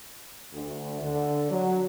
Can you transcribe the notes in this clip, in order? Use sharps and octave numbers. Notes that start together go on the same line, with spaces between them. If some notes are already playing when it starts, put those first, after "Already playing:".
D2
D3
F#3